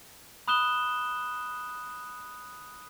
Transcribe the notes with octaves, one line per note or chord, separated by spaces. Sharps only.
B5 D#6 F#6 E7 G7